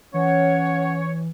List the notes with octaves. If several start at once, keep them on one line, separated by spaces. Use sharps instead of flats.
E3 C#4 C#5 F#5